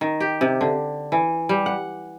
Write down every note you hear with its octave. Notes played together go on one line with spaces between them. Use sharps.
D#3
G4
C3
D3
E3
G3
F#5